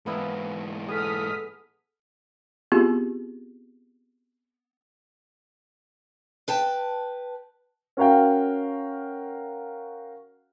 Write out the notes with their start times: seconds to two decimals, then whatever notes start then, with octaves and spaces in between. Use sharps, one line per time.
0.06 G#2 E3 A#3 B3 E4
0.88 B3 G#4 A4 D#6 F6 B6
2.72 B3 C4 E4 F4 G4 G#4
6.48 B4 G5 A5
7.97 C#4 F#4 A#4 F5 G5